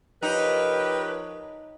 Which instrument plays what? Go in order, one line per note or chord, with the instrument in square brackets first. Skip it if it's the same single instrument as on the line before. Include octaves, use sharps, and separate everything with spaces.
[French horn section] F3 A#4 C#5 [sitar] D#4 [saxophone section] G4 B4